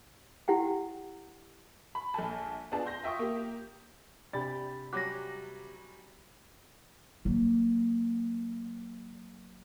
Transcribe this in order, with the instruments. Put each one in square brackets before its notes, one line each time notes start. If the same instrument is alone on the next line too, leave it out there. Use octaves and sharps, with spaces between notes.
[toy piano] E4 G4 F#5 G5
[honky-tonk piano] B5
A#1 A4 G#5 A5
B3 D4 F4 G#4 A5
C6 G6 A#6
F4 E5 G5 C#6 D#6
A#3 G4
[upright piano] C3 B5 A6 [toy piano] D4 D5 [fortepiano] G4
[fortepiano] F#3 G3 C#4 [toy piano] C#5 F#5 D6 [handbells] F#6 A#6
[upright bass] F#3 A#3